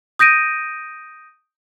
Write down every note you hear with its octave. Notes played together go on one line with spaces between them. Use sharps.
D#6 G6 A#6 D7 D#7